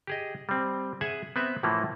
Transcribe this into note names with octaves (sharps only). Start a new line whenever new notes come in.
G4 G#4 D#5
G3 C4
G#4 E5 F#5 G#5
B3 C4 B4 E5
A2 E3 F3 A3 A#3